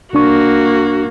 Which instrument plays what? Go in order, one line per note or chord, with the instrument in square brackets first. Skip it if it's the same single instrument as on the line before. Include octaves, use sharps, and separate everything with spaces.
[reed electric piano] C2 D4 C#6 [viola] A#3 F#4